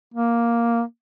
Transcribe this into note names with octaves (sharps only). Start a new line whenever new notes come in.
A#3